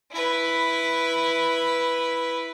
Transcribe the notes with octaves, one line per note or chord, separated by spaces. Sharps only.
E4 B4